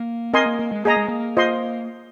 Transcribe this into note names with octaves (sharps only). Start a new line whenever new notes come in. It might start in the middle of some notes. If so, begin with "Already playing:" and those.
Already playing: A#3
C4 A#4 D#5 G#5 C6
A#3
A#3
G#3
A#3 G#4 D#5 A#5
G#3
A#3
F4 C5 D#5 C6